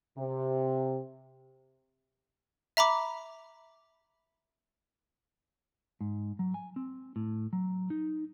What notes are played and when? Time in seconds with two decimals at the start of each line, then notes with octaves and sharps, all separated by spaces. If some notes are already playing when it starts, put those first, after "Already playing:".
0.18 C3
2.77 E5 A#5 B5 D6
6.01 G#2
6.39 F#3
6.54 G#5
6.76 C4
7.16 A2
7.53 F#3
7.90 D#4